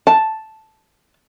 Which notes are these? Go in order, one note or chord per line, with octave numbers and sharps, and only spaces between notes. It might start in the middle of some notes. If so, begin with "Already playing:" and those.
A5